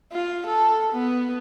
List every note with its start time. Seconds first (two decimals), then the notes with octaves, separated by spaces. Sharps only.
0.12 F4
0.47 A4
0.93 B3